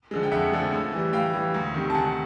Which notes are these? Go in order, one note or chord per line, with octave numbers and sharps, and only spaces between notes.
D3 F3 G#3
G5
F2 E5 F#5
D3 F3 G#3
A2
E3 G3
A2 F5 G5
E3 G3
D2
C3 D#3
A5
D2 F#5 G#5